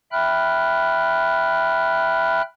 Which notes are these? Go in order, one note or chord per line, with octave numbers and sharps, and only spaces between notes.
E5 G5 B5 F6 F#6